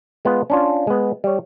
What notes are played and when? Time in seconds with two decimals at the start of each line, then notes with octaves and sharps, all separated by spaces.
0.25 G#3 B3 F4 G#4
0.50 C#4 D4 F4
0.87 G#3 B3
1.24 G3 C#5